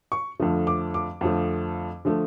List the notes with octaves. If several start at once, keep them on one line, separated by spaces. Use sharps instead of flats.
C#6
F2 D3 F3 A3
D6
D6
F2 D3 F3 A3
D3 F3 A3